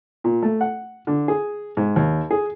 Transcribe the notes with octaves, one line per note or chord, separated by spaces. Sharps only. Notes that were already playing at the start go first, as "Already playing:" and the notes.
A#2
A3
F#5
D3
G#4
G#2
D#2
G#4